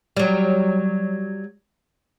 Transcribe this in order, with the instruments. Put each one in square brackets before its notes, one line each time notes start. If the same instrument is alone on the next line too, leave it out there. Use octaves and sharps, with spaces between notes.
[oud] F#3 G3